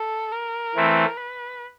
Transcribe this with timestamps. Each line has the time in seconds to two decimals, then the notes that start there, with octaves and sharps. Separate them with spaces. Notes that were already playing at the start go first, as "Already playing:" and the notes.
Already playing: A4
0.32 A#4
0.75 E3 A3 C4 E4
1.17 B4